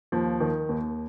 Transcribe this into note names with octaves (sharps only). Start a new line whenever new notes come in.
D#2 F3
D#3
D#2